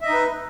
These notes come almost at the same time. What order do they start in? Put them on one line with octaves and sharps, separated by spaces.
E5 D#5 D#4 B4